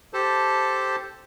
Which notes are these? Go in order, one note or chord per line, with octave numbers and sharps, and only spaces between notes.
G4 A4 C5 A5